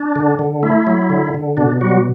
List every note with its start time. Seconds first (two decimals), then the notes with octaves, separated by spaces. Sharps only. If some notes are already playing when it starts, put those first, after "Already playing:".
Already playing: D4
0.16 D3
0.39 D3
0.63 A3 E4
0.87 F#3
1.10 D3
1.34 D3
1.57 B2 D4
1.81 F#3 G3 F#4